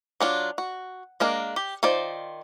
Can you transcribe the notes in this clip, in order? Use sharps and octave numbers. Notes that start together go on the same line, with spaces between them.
F#3 D4 F4
F#4
G#3 A#3 D4 A#4
G4
D#3 F4 C5 D5